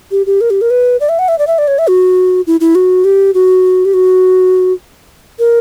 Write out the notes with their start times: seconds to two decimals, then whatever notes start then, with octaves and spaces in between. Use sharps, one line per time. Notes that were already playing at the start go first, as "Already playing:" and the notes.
0.11 G4
0.26 G4
0.41 A#4
0.50 G4
0.61 A#4
0.70 B4
1.00 D5
1.09 E5
1.19 F#5
1.28 E5
1.38 D5
1.47 E5
1.58 D5
1.68 C#5
1.79 E5
1.88 F#4
2.47 E4
2.61 E4
2.75 F#4
3.05 G4
3.34 F#4
3.85 G4
3.94 F#4
5.39 A#4